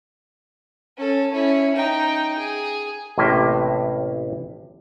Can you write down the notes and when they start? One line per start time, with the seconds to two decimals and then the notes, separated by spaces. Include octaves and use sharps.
0.97 C#4 A4
1.32 C#4 E4
1.76 D#4 G5
2.38 G#4
3.18 A1 A2 C3 A#3 E5 G5